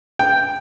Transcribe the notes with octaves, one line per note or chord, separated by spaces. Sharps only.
G5